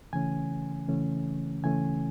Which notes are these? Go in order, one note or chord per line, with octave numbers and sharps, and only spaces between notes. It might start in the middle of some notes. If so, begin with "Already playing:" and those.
C#3 E3 A3 C#4 G#5
C#3 E3 A3 C#4
C#3 E3 A3 C#4 G#5